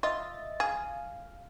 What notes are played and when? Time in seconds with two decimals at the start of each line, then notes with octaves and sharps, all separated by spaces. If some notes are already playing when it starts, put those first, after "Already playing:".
0.03 F4 D#5 E5 A6
0.60 G#4 F5